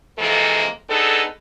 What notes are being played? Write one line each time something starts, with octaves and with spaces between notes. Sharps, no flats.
F2 C3 E3 G#3 A#3 A4
B3 D4 D#4 G#4 A4